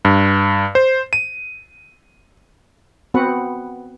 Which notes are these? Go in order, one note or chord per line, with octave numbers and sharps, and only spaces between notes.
G2
C5
D#7
B3 C4 F#4 B4 F#5